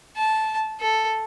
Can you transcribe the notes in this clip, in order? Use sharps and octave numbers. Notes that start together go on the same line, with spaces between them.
A5
A4